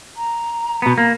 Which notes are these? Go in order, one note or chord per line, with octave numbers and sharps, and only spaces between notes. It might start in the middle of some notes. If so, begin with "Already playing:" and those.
A#5
B2 B3
A#3